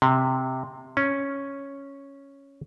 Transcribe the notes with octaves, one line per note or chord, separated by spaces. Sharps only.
C3
C#4